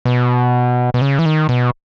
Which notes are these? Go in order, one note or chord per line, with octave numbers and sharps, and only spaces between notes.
B2
B2
C#3
E3
D#3
B2